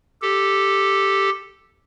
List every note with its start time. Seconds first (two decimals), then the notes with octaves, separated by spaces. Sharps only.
0.22 G4 A4